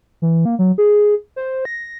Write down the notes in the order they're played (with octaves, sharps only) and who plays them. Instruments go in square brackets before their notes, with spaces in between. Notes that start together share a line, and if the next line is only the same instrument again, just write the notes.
[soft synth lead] E3
A#3
F#3
G#4
C5
A#6